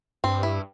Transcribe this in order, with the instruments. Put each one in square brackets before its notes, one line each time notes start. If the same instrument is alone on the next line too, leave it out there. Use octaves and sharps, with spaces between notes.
[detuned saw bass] G2 [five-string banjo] C4
[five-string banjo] E4